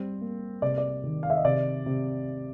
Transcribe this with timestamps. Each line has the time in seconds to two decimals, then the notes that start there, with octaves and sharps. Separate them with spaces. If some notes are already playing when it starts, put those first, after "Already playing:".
Already playing: G3 C4
0.21 A#3
0.62 C3 D5
0.78 D5
1.04 D#3
1.23 F5
1.30 E5
1.37 D#5
1.45 C3 D5
1.86 C3